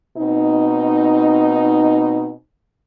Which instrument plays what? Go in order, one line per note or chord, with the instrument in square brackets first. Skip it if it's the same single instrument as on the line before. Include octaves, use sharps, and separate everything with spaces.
[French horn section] B2 C4 D#4